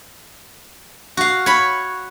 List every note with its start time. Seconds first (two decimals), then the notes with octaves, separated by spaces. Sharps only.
1.17 F#4 F5
1.46 C#5 B5